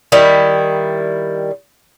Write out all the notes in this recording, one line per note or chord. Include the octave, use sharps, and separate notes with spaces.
D#3 G3 E4